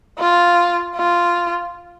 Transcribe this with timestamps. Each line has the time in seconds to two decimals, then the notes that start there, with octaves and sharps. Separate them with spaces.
0.19 F4
0.96 F4